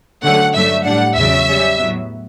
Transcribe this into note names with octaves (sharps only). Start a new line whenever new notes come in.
D3 F#3 A3 C#4 F#5
G2 F#3 A3 D4 E5
A2 G3 D4 F#5
E2 C#3 F#3 E5
C#3 G3 C#4
A2 F#3 B3